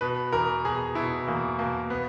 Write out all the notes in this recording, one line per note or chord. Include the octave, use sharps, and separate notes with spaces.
B2 B4
E2 A#4
B2 G#4
B2 E4
E2 A#3
B2 A#3
B3